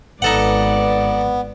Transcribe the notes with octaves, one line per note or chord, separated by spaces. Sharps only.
G#1 B3 D#4 A4 B4 D5 F#5